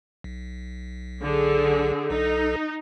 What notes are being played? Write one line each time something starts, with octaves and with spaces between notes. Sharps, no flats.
B1
D3 G#4
B1 D#4 A4